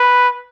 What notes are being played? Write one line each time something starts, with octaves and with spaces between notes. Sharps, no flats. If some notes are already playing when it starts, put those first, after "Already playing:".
Already playing: B4